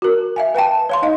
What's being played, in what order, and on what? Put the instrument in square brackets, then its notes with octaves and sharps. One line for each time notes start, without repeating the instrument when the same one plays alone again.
[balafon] F#4 A#4
E5 F5 G#5
B4 F5 G5 A5
C#5 F5 C6
D#4 D#5 F5